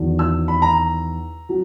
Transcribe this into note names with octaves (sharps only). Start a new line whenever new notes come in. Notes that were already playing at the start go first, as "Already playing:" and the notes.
Already playing: E2 D#3 F#3
E6
B5
A#5
F#3